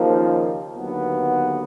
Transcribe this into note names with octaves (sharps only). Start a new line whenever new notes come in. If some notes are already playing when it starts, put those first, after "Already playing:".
Already playing: D#2 C#3 F3 A#3 D#4
D#2 D3 F#3 B3